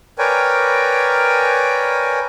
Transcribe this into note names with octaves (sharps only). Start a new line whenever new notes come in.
A#4 B4 C#5 D5 G5 G#5